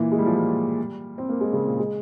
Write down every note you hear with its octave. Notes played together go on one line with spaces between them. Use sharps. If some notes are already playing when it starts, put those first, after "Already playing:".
Already playing: A#2 E3
G#3
G3
F3
G3
C4
A#3
G#3
C#3
A#2
G#3